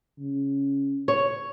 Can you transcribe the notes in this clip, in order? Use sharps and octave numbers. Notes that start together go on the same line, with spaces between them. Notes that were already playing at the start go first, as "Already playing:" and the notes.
C#3
C#5